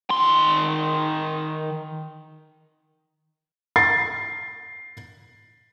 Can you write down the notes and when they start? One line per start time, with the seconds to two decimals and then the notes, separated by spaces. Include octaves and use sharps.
0.10 D#3 C6
3.76 A6 C7